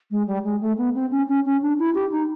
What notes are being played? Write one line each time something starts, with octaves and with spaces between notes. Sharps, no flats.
G#3
G3
G#3
A3
B3
C4
C#4
C#4
C#4
D4
E4
G4
D#4